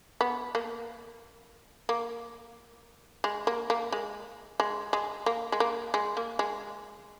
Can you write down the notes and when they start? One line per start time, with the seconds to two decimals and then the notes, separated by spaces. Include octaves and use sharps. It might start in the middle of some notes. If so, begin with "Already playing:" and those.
0.21 B3
0.55 A#3
1.89 A#3
3.24 G#3
3.47 A#3
3.70 A#3
3.92 G#3
4.60 G#3
4.93 G#3
5.26 A#3
5.52 G#3
5.60 A#3
5.94 G#3
6.17 A#3
6.39 G#3